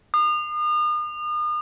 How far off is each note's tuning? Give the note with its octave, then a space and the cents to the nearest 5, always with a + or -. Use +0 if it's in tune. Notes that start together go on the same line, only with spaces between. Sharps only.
D#6 -40